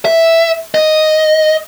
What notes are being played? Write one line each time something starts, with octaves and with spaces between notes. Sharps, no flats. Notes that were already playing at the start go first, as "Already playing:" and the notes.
E5
D#5